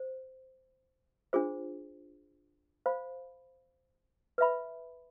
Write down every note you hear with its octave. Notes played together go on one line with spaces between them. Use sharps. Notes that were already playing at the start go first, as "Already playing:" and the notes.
Already playing: C5
D4 F4 G#4 C5
C5 F5 B5
B4 E5 B5